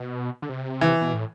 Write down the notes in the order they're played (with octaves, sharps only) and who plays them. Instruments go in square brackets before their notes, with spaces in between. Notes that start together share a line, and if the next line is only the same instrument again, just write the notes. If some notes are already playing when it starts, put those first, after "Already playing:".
Already playing: [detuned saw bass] B2
D3
C3
[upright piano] E3
[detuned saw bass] B2
A2